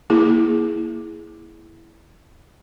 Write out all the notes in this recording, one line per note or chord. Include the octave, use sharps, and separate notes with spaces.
A#3 E4 G#4